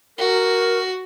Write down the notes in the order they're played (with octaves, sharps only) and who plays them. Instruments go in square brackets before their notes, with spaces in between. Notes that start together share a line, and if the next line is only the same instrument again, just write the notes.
[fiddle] F#4 [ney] A#4